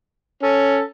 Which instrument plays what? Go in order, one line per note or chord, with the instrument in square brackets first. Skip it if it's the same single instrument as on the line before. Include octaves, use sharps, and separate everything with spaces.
[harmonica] C#4 [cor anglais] A4